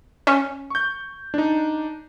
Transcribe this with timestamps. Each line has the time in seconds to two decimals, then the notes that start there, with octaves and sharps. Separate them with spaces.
0.27 C#4
0.70 C#6 G6
1.34 D4 D#4